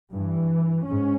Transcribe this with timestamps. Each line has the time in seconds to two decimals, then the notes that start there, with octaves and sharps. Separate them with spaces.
0.13 G2 E3
0.87 G#2 C#4